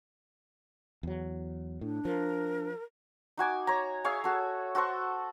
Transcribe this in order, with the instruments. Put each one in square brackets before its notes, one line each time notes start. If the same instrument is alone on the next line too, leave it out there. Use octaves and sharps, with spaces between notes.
[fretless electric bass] E2 F#3
[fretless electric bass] A2 [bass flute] D4
[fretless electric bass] F3 [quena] A#4
[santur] D#4 F#4 G#5 D6
C#5 A#5
G#4 C#5 E5 F5
F#4 A4
F#4 A4 C5 C#6